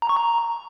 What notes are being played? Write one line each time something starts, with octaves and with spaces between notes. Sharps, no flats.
A#5
C#6
A#5